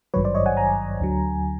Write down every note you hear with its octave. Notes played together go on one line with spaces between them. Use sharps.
G#1 G2 D#3 F#3 B4 C#5
C5 D5
C#5 D#5
F#5 G#5
G#5 A#5
D2 D3 F#3